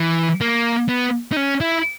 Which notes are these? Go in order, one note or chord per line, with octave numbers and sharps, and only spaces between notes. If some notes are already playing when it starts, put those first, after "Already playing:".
Already playing: E3
A#3
B3
D#4
C#4
E4